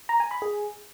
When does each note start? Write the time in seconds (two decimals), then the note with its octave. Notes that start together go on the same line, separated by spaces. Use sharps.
0.09 A#5
0.20 G#5
0.31 B5
0.42 G#4